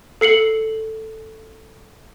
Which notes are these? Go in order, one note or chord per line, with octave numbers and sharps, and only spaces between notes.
A4 C7 C#7 F#7